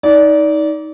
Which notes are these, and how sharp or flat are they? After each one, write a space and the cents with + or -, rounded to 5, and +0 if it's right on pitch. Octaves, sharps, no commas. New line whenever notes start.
D#4 +20 D5 -20